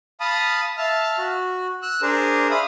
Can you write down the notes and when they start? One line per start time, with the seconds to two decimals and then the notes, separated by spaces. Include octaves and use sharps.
0.20 F5 A5 B5 D#6
0.78 E5 F5 A5 F6
1.18 F#4
1.82 E6 F#6
2.02 D4 G#4 A#4 C5
2.50 E5 F5 B5 D#6